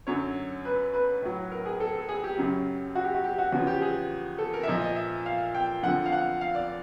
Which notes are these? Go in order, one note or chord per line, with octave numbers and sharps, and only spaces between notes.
F#2 D3 F#3 C#5
B4
B4
A2 F#3
A#4
G#4
A4
A4
G#4
G4
F#2 C#3 F#3
F#4
G4
F#4
G4
F#4
E2 C#3 F3 F#4
G4
G#4
A4
A#4
E5
A#2 F3 D#5
D#5
E5
F5
G5
F2 D3 F3 F#5
F5
F#5
F5
D5